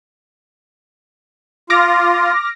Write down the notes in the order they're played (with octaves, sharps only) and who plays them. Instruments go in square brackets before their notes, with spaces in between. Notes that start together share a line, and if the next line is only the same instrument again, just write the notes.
[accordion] F4 [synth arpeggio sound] D6 F6 A#6